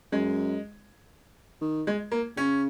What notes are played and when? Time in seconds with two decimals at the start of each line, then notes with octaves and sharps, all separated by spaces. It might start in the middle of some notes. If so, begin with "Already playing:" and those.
0.12 F#2 G#3
1.61 D#3
1.87 G#3
2.11 A#3
2.37 C#3 C#4